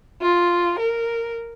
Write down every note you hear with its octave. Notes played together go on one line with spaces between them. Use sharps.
F4
A#4